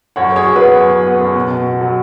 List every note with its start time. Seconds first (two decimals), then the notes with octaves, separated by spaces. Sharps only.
0.16 F#2 C#5 F#5
0.32 F#2 G#4 C#5
0.47 F#3
0.56 B3 F#4 B4
0.76 F#2
0.91 F#2
1.07 B3
1.21 F#2
1.36 B2
1.51 B2
1.66 B2
1.81 F#3